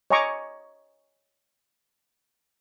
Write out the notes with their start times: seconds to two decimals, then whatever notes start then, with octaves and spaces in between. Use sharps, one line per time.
0.10 C#5 D#5 G#5 A#5 C#6 D6